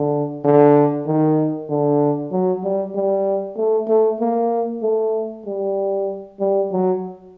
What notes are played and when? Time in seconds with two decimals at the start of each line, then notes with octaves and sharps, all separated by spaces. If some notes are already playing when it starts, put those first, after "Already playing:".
Already playing: D3
0.44 D3
1.06 D#3
1.70 D3
2.32 F#3
2.64 G3
2.95 G3
3.57 A3
3.88 A3
4.21 A#3
4.83 A3
5.46 G3
6.40 G3
6.72 F#3